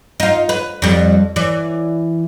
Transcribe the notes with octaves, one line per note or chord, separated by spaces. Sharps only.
D#4 F4
B4
F2 G3
E3 D5